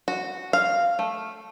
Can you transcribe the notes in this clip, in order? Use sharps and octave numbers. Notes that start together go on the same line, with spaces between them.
F#4
F5
A3